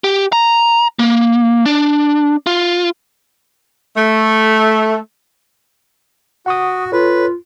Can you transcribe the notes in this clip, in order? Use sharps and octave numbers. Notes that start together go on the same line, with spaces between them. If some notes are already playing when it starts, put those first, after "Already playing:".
G4
A#5
A#3
D4
F4
A3
F#4 F#5 C#6 D#6
F4 A4 B4 C#5